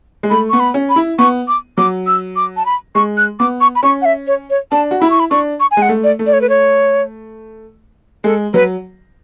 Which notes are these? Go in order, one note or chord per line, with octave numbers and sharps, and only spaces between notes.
G#3
A3 B5
B3 C#6
B5
C#4
B5
E4
B3 C#6
D6
F#3 D6
E6
D6
A5
B5
G#3 C#6
F#6
B3 D6
C#6
B5
C#4 C#6
F#5
E5
C#5
C#5
D4 A5
F#4
E4 B5
C#6
B5
D4 C#6
C#6
G#5
G#3
F#5
A3
D5
A3
D5
C#5
B4
C#5
G#3 A4
F#3 B4